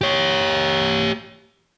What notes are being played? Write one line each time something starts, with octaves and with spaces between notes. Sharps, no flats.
G4 C#5